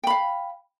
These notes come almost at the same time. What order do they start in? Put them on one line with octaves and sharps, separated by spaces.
G5 B5 F5